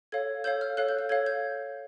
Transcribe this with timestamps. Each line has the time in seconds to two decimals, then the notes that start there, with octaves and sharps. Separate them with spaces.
0.12 A4 C#5 F5 G#6
0.44 A4 C#5 F5 G6
0.61 F6
0.77 A4 C#5 F5 F#6
0.89 G6
0.99 G6
1.09 A4 C#5 F5 G#6
1.26 G6